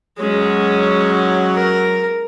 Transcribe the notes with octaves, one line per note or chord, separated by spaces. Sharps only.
F#3 G#3 C#4
A#4